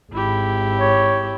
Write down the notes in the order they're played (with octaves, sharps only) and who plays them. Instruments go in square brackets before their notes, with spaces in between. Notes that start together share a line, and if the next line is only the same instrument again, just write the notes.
[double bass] G#1 [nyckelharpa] E4 G4
[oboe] C#5